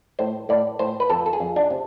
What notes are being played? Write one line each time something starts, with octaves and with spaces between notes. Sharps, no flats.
A2 C5
A2 D5
A2 C5
B4
F2 A4
A4
G#4
F2
D4
C3